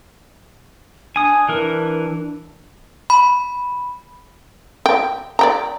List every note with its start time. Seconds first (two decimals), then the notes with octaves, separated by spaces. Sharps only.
1.16 D4 G#5 D#6
1.49 E3 A#4
3.10 B5
4.86 G5
5.39 D5 G5 A#5